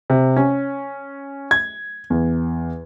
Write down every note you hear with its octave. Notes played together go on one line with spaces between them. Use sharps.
C3
C#4
G#6
E2